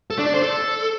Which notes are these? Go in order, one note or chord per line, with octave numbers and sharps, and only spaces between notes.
A4
D4
D5
C5
A4